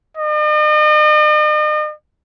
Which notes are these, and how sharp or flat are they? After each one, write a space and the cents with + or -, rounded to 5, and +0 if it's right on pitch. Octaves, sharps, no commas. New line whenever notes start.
D#5 -45